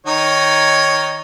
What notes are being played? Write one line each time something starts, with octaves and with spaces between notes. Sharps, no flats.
D#3 D#4 C#5